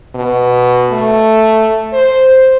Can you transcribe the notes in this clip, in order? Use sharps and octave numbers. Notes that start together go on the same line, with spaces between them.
B2
A3
C5